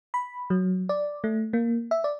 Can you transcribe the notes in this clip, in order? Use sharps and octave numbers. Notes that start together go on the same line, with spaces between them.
B5
F#3
D5
A3
A#3
E5
D5